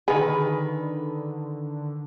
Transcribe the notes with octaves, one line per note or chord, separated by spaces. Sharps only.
D3 D#3 G#4 B4